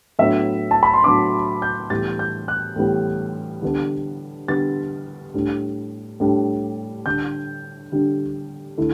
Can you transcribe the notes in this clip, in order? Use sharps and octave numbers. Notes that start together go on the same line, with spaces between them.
A2 F#3 B3 D4 E5
A5
B5
C6
A2 F#3 B3 D4 D6
G6
A2 E3 G3 B3 A6
G6
F#6
A2 E3 G3 B3
D3 G3 B3 D4
D3 G3 B3 D4 A6
A2 G3 D4
A2 G3 D4
D3 G3 D4 G6
D3 G3 D4
D3 A3 E4